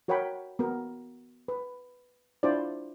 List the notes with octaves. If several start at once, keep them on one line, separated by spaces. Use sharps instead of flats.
F#4 A#4 C#5 F#5 G5 B5
B3 F#4 A#4
B4
D4 E4 F4 C5 D5